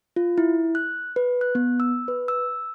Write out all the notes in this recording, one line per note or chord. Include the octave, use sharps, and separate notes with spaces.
F4
E4
F#6
B4
F#6
B3
E6
B4
E6